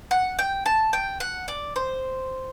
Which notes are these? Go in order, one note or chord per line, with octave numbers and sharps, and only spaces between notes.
F#5
G5
A5
G5
F#5
D5
C5